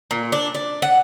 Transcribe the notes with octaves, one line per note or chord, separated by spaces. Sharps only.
A#2
D4
D5
F#5